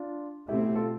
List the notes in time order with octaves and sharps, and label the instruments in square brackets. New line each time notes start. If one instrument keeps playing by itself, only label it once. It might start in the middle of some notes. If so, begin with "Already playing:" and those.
Already playing: [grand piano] D4 F4
[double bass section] B2 A3 C4 [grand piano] E4 G4
[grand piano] E4 G4
F4 A4